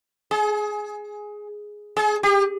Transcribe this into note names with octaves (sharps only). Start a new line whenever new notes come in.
G#4
G#4
G4